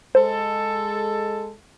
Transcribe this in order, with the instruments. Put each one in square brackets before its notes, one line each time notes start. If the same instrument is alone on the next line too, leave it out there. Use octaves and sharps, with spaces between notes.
[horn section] G#3 A4 [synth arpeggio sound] C5